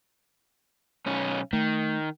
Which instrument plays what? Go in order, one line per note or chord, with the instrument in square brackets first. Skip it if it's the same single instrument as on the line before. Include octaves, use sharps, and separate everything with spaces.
[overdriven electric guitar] B1 C#4
[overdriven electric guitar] D#3 [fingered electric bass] A3